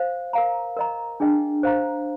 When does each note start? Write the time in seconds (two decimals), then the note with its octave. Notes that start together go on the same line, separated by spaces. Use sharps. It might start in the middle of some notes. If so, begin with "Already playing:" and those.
Already playing: C5 F5
0.33 A#4 F5 A#5
0.76 A#4 D#5 A#5
1.20 D4 G#4 D#5 G5
1.63 C5 F5 A#5